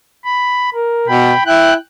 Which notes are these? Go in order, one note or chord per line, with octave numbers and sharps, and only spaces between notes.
B5
A#4
B2 G5 B5
E4 G5 F#6